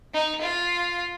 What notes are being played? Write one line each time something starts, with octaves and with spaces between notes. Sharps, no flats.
D#4
F4